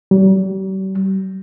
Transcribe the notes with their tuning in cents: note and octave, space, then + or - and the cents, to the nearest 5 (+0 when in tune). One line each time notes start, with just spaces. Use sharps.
G3 -45